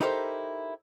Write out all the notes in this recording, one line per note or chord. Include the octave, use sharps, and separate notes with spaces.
D#4 E4 G4 A4 A#4 C5